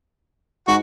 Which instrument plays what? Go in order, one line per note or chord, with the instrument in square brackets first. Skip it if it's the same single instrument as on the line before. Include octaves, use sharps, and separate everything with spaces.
[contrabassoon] G#2 [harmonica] F#4